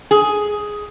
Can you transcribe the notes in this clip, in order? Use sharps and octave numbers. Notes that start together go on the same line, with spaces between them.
G#4